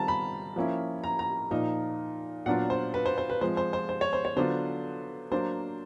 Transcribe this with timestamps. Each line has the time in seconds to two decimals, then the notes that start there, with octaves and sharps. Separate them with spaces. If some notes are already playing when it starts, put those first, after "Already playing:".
Already playing: D#3 G3 C4 F4 A5 A#5
0.08 B5
0.56 F3 A#3 C#4 E4
1.04 A#5
1.19 A#5
1.51 A#2 F3 A#3 D#4
2.46 A#2 F#3 B3 D4 F4 F#5
2.70 C5
2.94 B4
3.06 C5
3.18 C5
3.30 B4
3.41 F3 G#3 C4 C5
3.57 C5
3.73 C5
3.89 C5
4.01 C#5
4.13 C5
4.25 C#5
4.36 D3 F#3 B3 D4 F4 C5
5.31 F#3 A#3 D4 C5